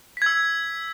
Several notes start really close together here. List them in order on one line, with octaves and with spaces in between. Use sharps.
B6 G#6 E6